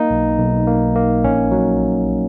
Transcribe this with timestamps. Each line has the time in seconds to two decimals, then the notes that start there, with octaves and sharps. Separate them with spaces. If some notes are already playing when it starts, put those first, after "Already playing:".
Already playing: A#3 D#4
0.10 B1
0.39 B1
0.67 A#3
0.95 A#3
1.24 A#1 C#4
1.52 F#3